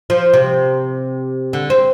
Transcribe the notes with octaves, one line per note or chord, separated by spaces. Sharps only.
F3
C3
D3
C4